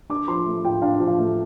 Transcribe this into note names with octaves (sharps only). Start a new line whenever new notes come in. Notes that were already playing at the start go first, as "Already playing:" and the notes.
D4 D6
F3 C6
A3
F4 G5
D4 F5
F3
F5
A3